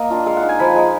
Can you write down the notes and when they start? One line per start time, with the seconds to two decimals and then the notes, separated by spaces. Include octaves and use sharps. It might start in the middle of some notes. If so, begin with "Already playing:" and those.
Already playing: A#3 D#5
0.10 D4 F4
0.26 G#3 F5
0.37 F#5
0.42 D#4
0.49 G#5
0.59 F3 B5
0.76 G#3 D#4